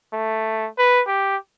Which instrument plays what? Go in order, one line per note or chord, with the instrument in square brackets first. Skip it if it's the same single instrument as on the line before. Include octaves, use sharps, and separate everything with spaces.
[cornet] A3
B4
G4